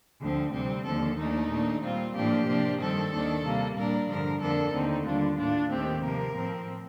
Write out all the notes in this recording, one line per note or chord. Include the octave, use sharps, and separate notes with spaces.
D2 D3 F3 C4
D2 C3 G3 C4
D#2 D3 F3 A4
D#2 D#3 A3 D4 D#4
A#2 A3 D4
A#2 G3 C4 F4
A2 F3 A#3 D4 G4
C3 F3 A#3 D4
G2 D#3 G3 C4 A4
D#2 D#3 A#3 D4
C3 G3 A#3
A#2 G3 D4 A#4
G2 D3 F3 A#4
F2 D3 F3 A#3 D4 A4
D#2 D3 A3 C4 D#4
D#2 D3 G3 D4 F4
A2 A3 D4 F4
D#2 D#3 A3 C4 G4
C3 F3 A#3 A#4
A2 F3 C4